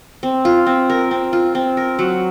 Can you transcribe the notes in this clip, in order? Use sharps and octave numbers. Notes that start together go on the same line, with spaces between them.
C4
F4
C4
A#4
C4
F4
C4
A#4
F#3